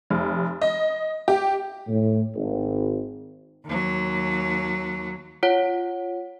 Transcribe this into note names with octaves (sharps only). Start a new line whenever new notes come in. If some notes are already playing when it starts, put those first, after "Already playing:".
F1
D#5
G4
A2
G#1
D#2 F#3
F4 C#5 F#5